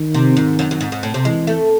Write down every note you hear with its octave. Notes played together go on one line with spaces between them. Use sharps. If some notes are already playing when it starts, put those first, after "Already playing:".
Already playing: D#3
C3
G#2
F#2
F#2
G#2
G#2
A2
C3
E3 G#3
A3